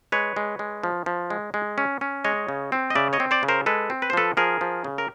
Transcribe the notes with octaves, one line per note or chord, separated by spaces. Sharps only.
G#3 B4 C#5
G#3
G#3
F3
F3
G#3
G#3
C#4
C#4
G#3 C#5 D#5
C#3
C4
D#5
C#3 D5 E5
C#5 D#5
C4
C5 D5
C#3
A#4 C5
G#3 A4 B4
C4
B4
C5
F3 A4 B4
F3 G#4 A#4
F3
C#3
A#4